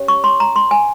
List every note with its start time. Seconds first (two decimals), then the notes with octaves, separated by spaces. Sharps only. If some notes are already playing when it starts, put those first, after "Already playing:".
Already playing: C#4 G4 C#5
0.08 C#6
0.24 C6
0.40 A#5
0.56 C6
0.71 G#5